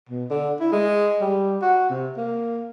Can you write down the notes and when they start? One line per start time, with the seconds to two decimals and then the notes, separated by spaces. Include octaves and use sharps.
0.09 B2
0.30 D3
0.60 E4
0.72 G#3
1.21 G3
1.62 F#4
1.90 C3
2.17 A#3